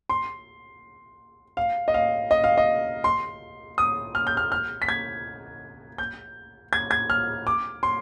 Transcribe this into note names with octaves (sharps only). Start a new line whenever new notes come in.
C6
F5
D#5
F5
D#5
F5
D#5
C6
D#6
F6
G6
F6
F6
B6
G#6
G6
G#6
G#6
F6
D6
C6